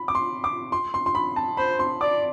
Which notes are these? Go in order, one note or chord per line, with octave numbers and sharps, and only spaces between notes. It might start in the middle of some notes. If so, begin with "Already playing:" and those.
Already playing: B5
D6
C6
D6
C6
C6
C6
B5
A5
C5 B5
C6
D5 D6